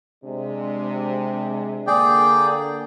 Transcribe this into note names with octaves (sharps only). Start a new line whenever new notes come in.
C3 G#3 D4
D3 A#3 G#4 D5 G5